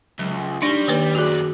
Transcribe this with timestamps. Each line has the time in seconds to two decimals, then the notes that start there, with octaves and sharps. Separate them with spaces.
0.19 C#2 F#3
0.62 G3 D4 D#4 A#6
0.88 D#3 A#3 B4
1.15 F#2 F#4 G#4 D5